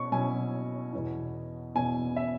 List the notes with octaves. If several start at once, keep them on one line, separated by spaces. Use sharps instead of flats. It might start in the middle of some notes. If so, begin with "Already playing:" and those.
Already playing: B2 C#4 C#6
B2 F#3 C#4 E4 G#5
E2 B2 B3 E4
E2 B2 B3 E4 G#5
E5